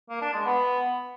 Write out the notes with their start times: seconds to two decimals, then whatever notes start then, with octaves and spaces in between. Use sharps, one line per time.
0.10 A#3
0.22 D4
0.33 G#3
0.45 B3